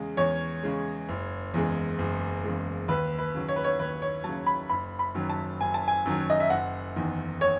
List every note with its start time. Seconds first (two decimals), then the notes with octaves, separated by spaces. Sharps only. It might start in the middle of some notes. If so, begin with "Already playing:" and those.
Already playing: E2 C#3 G#3
0.17 E2 C#5
0.63 C#3 G#3
1.09 F#1
1.54 E2 C#3 G#3
1.99 F#1
2.44 E2 C#3 G#3
2.88 D#2 B4
3.18 B4
3.35 C#3 F#3
3.49 C#5
3.56 B4
3.64 C#5
3.79 D#2 B4
4.02 C#5
4.24 C#3 F#3 A5
4.46 B5
4.69 F#1 B5
4.99 B5
5.15 F#2 D#3 F#3
5.30 A5
5.61 F#1 G#5
5.74 A5
5.88 G#5
6.05 F#2 D#3 F#3
6.30 D#5
6.40 E5
6.50 F#1 F#5
6.96 E2 D#3
7.41 C#5